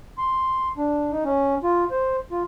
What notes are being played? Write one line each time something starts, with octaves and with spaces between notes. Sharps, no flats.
C6
D4
D#4
C#4
F4
C5
F4